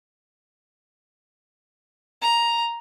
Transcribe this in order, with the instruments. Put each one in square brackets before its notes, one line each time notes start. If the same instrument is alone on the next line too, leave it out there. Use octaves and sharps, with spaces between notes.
[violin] A#5